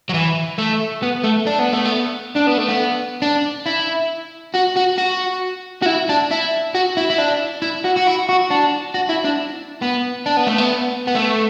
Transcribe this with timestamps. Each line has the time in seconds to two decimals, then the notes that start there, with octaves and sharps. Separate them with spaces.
0.09 F#3
0.14 E3
0.58 A3
1.02 B3
1.24 A3
1.47 D4
1.59 B3
1.73 A3
1.85 B3
2.35 D4
2.46 B3
2.57 A3
2.68 B3
3.22 D4
3.66 E4
4.55 F#4
4.77 F#4
4.98 F#4
5.82 F#4
5.86 E4
6.09 D4
6.31 E4
6.74 F#4
6.97 E4
7.10 E4
7.18 D4
7.62 E4
7.84 F#4
7.96 F#4
8.07 E4
8.29 F#4
8.51 D4
8.94 F#4
9.09 E4
9.24 D4
9.82 B3
10.26 D4
10.37 B3
10.47 A3
10.58 B3
11.07 B3
11.15 A3